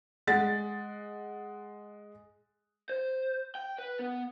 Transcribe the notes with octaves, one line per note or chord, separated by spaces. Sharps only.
G#3 F#5 A6
C5
G5
B4
B3